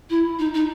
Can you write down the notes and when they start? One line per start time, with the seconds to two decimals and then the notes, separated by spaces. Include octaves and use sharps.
0.10 E4
0.39 D#4
0.54 D#4